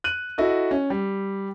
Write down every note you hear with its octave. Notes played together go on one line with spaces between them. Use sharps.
F#6 D#7 F#7
E4 F#4 A4 D#5
C#4
G3